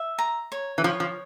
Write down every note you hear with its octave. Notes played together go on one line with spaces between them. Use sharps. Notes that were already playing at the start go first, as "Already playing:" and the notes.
Already playing: E5
A#5
C#5
E3
F3 C#5
F3